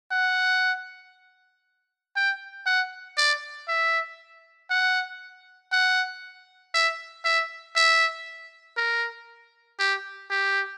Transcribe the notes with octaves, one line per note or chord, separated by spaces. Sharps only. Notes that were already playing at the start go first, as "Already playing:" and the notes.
F#5
G5
F#5
D5
E5
F#5
F#5
E5
E5
E5
A#4
G4
G4